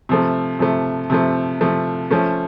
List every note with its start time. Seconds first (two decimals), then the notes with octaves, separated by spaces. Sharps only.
0.09 C3 F3 A3
0.59 C3 F3 A3
1.10 C3 F3 A3
1.61 C3 F3 A3
2.11 F3 A3 C#4